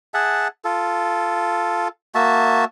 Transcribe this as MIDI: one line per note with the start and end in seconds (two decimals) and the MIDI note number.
0.14 0.48 68
0.14 0.48 76
0.14 0.48 78
0.14 0.48 81
0.65 1.88 65
0.65 1.88 69
2.15 2.65 58
2.15 2.65 66
2.15 2.65 76
2.15 2.65 81